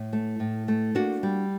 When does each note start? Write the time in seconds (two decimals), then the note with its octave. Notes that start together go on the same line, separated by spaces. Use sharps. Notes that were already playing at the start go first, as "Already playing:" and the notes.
Already playing: A2
0.13 A3
0.40 A2
0.68 A3
0.95 A#3 D4 F#4
1.23 G3